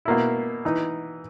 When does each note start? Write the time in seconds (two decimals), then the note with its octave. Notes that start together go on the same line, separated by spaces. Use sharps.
0.05 B2 A#3 E4
0.65 E3 D#4